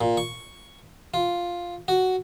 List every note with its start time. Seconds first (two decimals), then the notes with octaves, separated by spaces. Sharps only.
0.01 A#2
0.17 C#6
1.14 F4
1.88 F#4